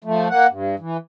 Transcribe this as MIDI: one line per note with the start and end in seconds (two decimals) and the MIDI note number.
0.04 0.28 53
0.04 0.28 57
0.29 0.47 58
0.29 0.47 78
0.49 0.75 43
0.79 0.97 52